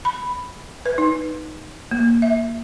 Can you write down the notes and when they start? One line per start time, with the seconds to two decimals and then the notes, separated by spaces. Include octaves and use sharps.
0.05 B5
0.86 B4
0.98 D#4
1.91 A#3
2.22 E5